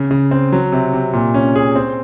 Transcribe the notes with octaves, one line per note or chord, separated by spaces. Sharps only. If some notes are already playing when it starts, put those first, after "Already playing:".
Already playing: C#3
C#3
C4
F#3
C3
C3
A#2
C#4
G#4
C4